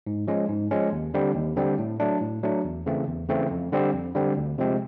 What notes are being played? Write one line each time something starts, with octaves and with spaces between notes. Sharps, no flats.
G#2
F3 G#3 C#4
G#2
F3 G#3 C#4
D#2
D3 G3 C4
D#2
D3 G3 C4
A2
F#3 A3 D4
A2
F#3 A3 D4
E2
C#3 E3 A3 C4
E2
C#3 E3 A3 C4
F2
D3 G3 C4
F2
D3 G3 C4
D2
C3 F3 G#3 C4